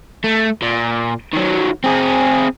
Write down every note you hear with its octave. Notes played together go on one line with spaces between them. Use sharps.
A3
A#2
D#3 F#3
C4 G#4